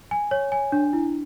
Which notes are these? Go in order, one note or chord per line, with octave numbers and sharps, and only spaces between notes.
G#5
C#5
G#5
D4
E4